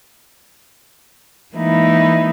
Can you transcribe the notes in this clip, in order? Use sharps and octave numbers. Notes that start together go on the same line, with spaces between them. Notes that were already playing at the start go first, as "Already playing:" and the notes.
E3 G#3 A#3 D#4 E4